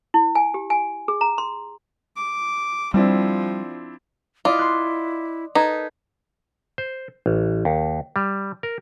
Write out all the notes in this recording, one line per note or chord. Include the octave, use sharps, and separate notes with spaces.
E4
G#5
G4
G#5
G#4
A#5
C6
D6
F3 G3 C4 D4 E4
E4 F4 D5 D#5
C6 F#6
D#4 A4 B4 G#6
C5
A1
D#2
G3
A#4